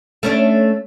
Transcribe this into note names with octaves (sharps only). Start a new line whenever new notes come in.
A3 C#4 D4